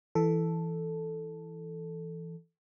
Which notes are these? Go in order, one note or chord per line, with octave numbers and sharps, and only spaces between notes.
E3 A4